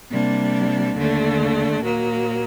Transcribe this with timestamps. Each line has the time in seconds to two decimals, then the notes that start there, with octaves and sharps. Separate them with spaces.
0.10 C3 G3 A#3 D4
0.96 D#2 D3 A3 D4
1.82 A#2 F#3 A#3